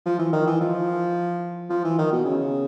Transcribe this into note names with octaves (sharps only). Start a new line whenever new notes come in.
F3
E3
D#3
E3
F3
F3
E3
D#3
B2
C#3